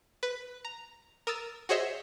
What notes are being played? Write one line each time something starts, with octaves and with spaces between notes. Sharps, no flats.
B4
A#5
A#4 D#6 E6 A6
F#4 G#4 C5 C#5 D#5 E5